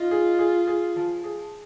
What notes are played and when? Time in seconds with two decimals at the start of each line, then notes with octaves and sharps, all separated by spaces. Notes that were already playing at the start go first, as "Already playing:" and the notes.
Already playing: D#4 F4
0.11 G#4
0.39 G#4
0.67 G#4
0.96 F3
1.24 G#4